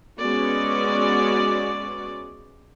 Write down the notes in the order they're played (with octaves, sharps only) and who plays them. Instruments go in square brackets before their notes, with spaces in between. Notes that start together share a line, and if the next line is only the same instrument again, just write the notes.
[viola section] G#3 B3 C#4 F#4 D5